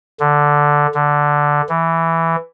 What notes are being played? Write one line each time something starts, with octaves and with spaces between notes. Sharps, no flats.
D3
D3
E3